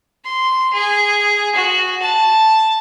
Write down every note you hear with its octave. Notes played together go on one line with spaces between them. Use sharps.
C6
G#4
F#4
A5